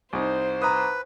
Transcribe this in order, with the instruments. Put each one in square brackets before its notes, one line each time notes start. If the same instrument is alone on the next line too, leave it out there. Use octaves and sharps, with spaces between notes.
[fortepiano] C2 D#4 [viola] C5
[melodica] B4 [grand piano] A#5 D#6